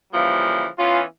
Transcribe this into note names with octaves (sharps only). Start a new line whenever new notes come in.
C#3 E3 F3 G3 A#3
E3 B3 C#4 F4